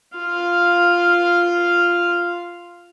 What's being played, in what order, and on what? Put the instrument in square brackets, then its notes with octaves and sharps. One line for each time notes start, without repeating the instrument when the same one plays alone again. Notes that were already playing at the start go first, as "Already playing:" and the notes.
[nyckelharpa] F4 F5